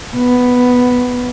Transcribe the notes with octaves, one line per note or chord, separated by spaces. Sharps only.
B3